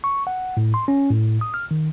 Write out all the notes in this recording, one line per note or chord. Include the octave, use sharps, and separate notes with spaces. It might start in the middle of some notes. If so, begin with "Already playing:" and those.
C#6
F#5
A2
C6
C#4
A2
D#6
F6
D#3